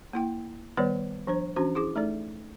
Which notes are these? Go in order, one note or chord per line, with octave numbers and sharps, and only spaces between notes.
A#3 E4 G5
D#3 G3 B3 B4 C#5 D5
F3 D4 C5
E3 C#4 D4 F#4 C5
E4 G#4 D6
A3 D#4 A4 D5